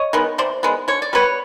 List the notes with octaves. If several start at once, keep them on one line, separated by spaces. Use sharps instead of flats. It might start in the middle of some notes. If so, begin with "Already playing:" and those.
Already playing: C#5 D#5
D#3 G#3 B3
C3 C5 D5
D#3 G#3 B3
D3 C#5
D5
G3 B3 B4 C#5